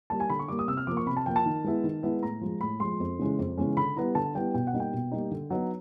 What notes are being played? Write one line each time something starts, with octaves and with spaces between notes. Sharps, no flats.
G3 A#3 A5
G#5
D3 B5
C#6
G3 A#3 D6
D#6
C3 E6
F6
F3 A#3 D6
C#6
C3 B5
A5
F3 A#3 G5
A5
D#3
G#3 B3 E4
D#3
G#3 B3 E4
A2 A#5
F3 G#3
A2 B5
F3 G#3 C6
F2
C#3 E3 G#3 C#4
F2
C#3 E3 G#3 C#4
D3 B5
G3 B3 E4 A#5
D3 A5
G3 B3 E4 G5
B2 G5
F#5
G3 A#3 D#4
G5
B2
G3 A#3 D#4
D3
F#3 B3 D#4